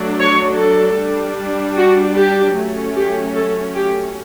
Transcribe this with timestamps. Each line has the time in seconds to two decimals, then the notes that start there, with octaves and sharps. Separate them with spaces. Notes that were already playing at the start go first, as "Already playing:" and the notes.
Already playing: F#3 A3 D4
0.19 C#5
0.57 A4
0.97 G3 D4
1.76 F#4
2.16 G4
2.55 F#3 A3 C#4
2.94 G4
3.34 A4
3.74 G4